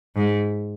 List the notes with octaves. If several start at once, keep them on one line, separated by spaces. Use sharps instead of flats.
G#2